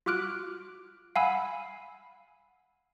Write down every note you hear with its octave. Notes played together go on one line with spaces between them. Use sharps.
F4 F#4 D6 F6 F#6 D7
F5 F#5 G#5 B5 E6